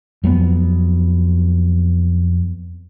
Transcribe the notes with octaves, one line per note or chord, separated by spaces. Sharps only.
F2 F#3 G#3 B3